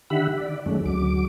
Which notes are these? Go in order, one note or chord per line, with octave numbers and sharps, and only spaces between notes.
D3 D#3 G4 E5 F#5 B5
D5
F#2 D#3 G#3 A3 C#4
D2 F#3 D6